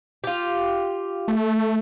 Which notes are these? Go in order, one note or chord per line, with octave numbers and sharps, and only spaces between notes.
F4 G4
A3